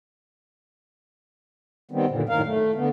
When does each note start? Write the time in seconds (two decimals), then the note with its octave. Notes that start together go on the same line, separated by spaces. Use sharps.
1.91 D#3 G3 B3 C4
2.09 F#2 A#2 D3
2.29 F#2 A2 D#3 A#4 F5
2.46 A3
2.75 D3 B3